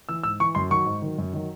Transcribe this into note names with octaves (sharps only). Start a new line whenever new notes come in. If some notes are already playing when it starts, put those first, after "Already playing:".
E3 E6
G#2 E6
E3 C#6
F#2 C6
D#3 F#3 C#6
G#2
D#3 F#3
F#2
D#3 F#3